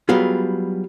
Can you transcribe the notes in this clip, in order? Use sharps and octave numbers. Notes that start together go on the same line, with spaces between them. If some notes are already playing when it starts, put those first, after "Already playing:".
F#3 G3 B3 F4 G#4